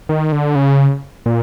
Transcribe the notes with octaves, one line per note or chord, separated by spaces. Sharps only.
D#3
D3
C#3
A#2